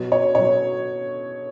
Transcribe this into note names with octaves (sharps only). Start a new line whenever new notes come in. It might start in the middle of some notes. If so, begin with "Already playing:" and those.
Already playing: B2 F#3
C#5
B2 F#3 C#5